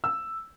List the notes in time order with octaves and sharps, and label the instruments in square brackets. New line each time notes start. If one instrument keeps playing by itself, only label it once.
[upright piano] E6